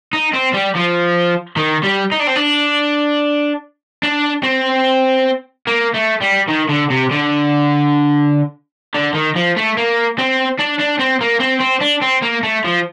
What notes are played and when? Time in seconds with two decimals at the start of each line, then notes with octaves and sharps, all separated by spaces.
0.13 D#4
0.33 C4
0.54 G3
0.75 F3
1.57 D#3
1.83 G3
2.12 D#4
2.20 D4
2.27 C4
2.36 D4
4.03 D4
4.43 C4
5.67 A#3
5.94 A3
6.22 G3
6.49 D#3
6.69 D3
6.90 C3
7.11 D3
8.95 D3
9.15 D#3
9.36 F3
9.57 A3
9.77 A#3
10.18 C4
10.59 D4
10.80 D4
11.00 C4
11.21 A#3
11.40 C4
11.61 C4
11.81 D4
12.02 C4
12.23 A#3
12.43 A3
12.64 F3